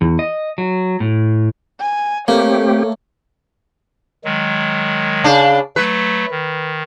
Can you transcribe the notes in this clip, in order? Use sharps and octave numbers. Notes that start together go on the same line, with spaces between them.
E2
D#5
F#3
A2
G#5
A3 A#3 C4 G4 C#5
D#3 F#3 G#3
C#3 D4
F#3 A3 B4
D#3